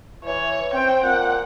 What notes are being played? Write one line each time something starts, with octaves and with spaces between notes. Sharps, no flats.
E3 C#5
C4 G5
A#2 F#5